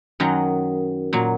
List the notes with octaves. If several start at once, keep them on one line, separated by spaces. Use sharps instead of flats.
F#2 D#3 F#3 D#5
A#2 F#3